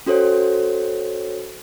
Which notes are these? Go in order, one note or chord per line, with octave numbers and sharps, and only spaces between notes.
C#4 F#4 A4 C5 C#5